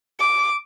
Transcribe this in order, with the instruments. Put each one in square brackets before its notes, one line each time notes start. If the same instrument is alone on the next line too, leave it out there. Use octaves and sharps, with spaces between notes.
[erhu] D6